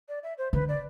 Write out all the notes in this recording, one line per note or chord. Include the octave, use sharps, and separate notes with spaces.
D5
E5
C5
D3 B4
D5